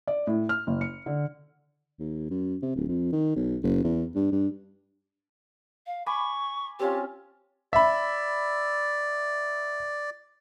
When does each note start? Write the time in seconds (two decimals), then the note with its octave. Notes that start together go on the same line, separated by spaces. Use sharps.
0.07 D5
0.27 A2
0.49 F6
0.67 F#1
0.81 C#7
1.06 D3
1.99 D#2
2.30 F#2
2.62 C3
2.76 D1
2.88 F2
3.13 D#3
3.36 B1
3.63 F#1
3.84 E2
4.16 G2
4.32 G2
5.87 F5
6.06 G#5 B5 C#6 D6
6.79 C4 C#4 F4 G4
7.73 D5 E5 B5